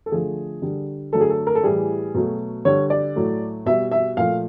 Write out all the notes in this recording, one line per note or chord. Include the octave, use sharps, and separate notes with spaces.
A4
D3 F3 A3 G#4
D3 G3
D3 F#3 A3 A4
G#4
A4
A#4
A4
A2 E3 G3 G#4
B2 F#3 A3
D3 G3 C#5
D5
A2 F#3 A3
B2 G3 E5
E5
A#2 F3 A3 F5